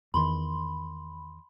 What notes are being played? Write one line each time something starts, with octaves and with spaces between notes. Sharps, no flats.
E2 D#3 B5 C6